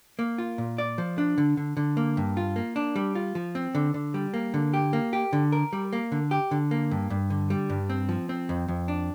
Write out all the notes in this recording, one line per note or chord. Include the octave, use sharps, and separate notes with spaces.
A#3
F4
A#2
D5
F3
D4
D3
D3
D3
A#3
G2
F4
A#3
D4
G3
F4
F3
C4
D3
D3
G3
A#3
D3
G4
A#3
G4
D3
A#4
G3
A#3
D3
G4
D3
A#3
G2
G2
D3
G3
G2
C4
F3
C4
F2
F2
D4